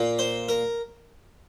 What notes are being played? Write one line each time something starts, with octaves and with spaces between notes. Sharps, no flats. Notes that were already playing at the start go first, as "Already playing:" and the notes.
Already playing: A#2 A#3
C5
A#4